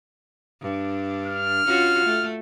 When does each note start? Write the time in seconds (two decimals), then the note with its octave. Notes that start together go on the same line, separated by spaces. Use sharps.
0.62 G2 D4
1.27 F6
1.67 C#4 F4 F#4
2.05 A3